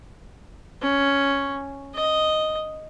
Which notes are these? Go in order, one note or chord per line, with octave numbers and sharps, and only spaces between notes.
C#4
D#5